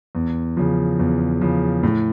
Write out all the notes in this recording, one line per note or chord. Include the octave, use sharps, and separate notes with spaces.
E2
C#3 F3
E2
C#3 F3
A2